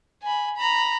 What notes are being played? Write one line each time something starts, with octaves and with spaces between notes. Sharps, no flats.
G#5 B5
A#5 B5